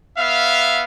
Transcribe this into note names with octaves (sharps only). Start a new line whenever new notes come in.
B3 E5 F5